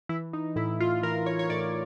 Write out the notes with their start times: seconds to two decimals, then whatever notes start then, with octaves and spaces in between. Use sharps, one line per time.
0.09 E3 E4
0.33 D#4
0.56 A2 E4
0.80 F4
1.03 E3 A#4
1.26 C#5
1.39 C#5
1.50 A2 D5